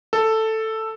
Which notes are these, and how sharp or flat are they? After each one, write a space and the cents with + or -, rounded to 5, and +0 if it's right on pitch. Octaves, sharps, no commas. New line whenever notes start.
A4 +5